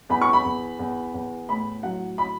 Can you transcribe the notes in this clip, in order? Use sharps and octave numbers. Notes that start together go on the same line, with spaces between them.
E2 B5
C#6
B5
E2
E2
E2
A2 B5
F#3 F#5
B5